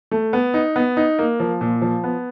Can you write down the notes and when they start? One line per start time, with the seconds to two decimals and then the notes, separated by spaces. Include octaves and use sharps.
0.11 A3
0.33 B3
0.54 D#4
0.76 B3
0.97 D#4
1.19 A#3
1.40 F3
1.61 A#2
1.82 F3
2.04 B3